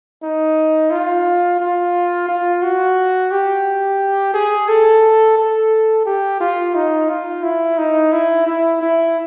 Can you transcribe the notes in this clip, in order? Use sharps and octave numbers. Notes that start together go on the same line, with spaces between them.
D#4
F4
F4
F4
F#4
G4
G#4
A4
A4
G4
F4
D#4
F4
E4
D#4
E4
E4
E4